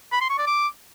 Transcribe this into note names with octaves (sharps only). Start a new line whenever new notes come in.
B5
C6
C#6
D5
D6